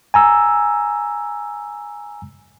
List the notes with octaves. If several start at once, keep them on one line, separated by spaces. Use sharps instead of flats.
G#5 A#5 E6